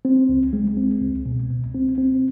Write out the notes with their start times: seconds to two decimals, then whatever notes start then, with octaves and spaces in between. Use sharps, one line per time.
0.05 C4
0.29 C#2
0.53 G#3
0.77 C4
1.01 C#2
1.26 B2
1.50 C#2
1.75 C4
1.98 C4